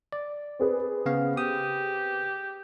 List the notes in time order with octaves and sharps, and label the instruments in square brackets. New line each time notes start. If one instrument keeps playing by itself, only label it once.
[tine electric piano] D5
[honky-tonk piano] C4 G#4 B4
[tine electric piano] C#3 B3 F5
[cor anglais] G4 [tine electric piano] D#6